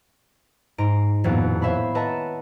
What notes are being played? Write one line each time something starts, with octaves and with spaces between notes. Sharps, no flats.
G#2 A#5 C6 D7
D#1 F2 A2 A#3 B3 F#5
C5 C#5 E5 F5 B5
B4 D#5 E5 F#5 A5 A#5